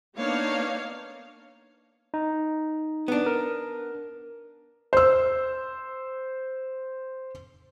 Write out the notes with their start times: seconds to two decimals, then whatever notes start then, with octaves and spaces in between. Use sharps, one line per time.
0.17 A#3 B3 D4 D#4 C#5 F5
2.14 D#4
3.08 B3 D4
3.26 A#4
4.93 C5 E6